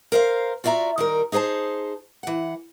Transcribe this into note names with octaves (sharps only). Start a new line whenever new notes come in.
A#4 C5 E5 F5
F4 F#4 D5 E5 A#5
D#3 G3 A#4
D#4 G#4 C5 G#5 A5
E3 F#5